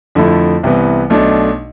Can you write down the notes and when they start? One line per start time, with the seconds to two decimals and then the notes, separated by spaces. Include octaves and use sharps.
0.15 F2 D3 F3 A3 E4
0.63 C2 C3 E3 B3
1.10 B1 B2 A3 D4